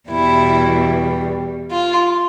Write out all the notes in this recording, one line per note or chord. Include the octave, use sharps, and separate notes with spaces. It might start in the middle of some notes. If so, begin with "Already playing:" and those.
E2 B2 G3 E4
F4